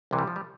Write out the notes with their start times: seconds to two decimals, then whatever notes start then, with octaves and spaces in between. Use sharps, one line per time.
0.11 C2 C3 E3
0.19 G3
0.27 F3
0.36 G3